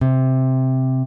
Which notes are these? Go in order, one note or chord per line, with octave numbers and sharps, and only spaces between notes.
C3